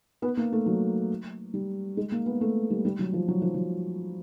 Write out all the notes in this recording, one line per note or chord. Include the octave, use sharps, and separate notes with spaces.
B3
A#3
A3
F#3
G3
G#3
A#3
B3
A3
G3
G3
F#3
F3
F#3
F3
F#3